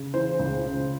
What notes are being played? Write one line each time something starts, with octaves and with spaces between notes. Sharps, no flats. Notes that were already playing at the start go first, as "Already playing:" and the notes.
Already playing: C#3
E3 C5
C#2
C#3